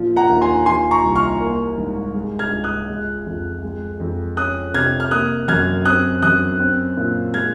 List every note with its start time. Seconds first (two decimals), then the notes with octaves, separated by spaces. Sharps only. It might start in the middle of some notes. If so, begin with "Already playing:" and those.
Already playing: A#2 F3
0.16 F#5 A#5
0.29 D#2
0.41 G#5 C6
0.66 F3 G#5 C6
0.91 A#5 C#6
1.03 C2
1.15 C#6 F6
1.40 A#3
1.78 G#2
2.14 G#3
2.39 F6 G#6
2.52 C#2
2.64 D#6 F#6
2.89 G#3
3.26 F2
3.63 G#3
4.00 F2
4.37 C#4 D#6 F#6
4.74 C3 F6 G#6
5.00 F6
5.11 A#3 D#6 F#6
5.48 F#2 F6 G#6
5.85 C4 D#6 F#6
6.22 F#2 D#6 F#6
6.60 C4
6.97 A#2
7.34 G#3 F6 G#6